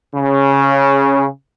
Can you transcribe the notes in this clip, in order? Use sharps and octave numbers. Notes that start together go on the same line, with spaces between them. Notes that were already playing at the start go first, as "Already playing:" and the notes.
C#3